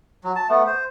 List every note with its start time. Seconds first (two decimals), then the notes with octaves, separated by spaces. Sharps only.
0.24 F#3
0.36 A5
0.49 A3 B3
0.66 C5